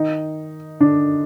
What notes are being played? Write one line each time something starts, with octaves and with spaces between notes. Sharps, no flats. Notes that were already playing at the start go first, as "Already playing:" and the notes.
Already playing: D#3 D#4
D3 D4